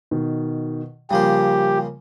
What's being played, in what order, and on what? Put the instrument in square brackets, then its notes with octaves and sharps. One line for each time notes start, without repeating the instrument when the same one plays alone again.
[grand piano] B2 D#3
[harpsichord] C#3 A#3 C5 [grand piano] F3 G3 [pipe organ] G4